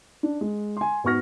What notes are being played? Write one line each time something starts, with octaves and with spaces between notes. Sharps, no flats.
D4
G#3
G#5 C6
G#2 B3 F#4 C#6 F6 A#6